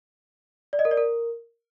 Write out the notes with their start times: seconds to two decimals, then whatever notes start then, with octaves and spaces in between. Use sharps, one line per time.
0.73 D5
0.79 D#5
0.85 A#4
0.91 D5
0.97 A#4